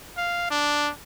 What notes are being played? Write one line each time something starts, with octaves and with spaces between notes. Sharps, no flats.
F5
D4